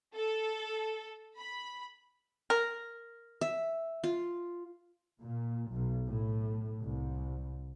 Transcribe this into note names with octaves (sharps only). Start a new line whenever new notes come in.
A4
B5
A#4
E5
F4
A#2
B1
A2
C2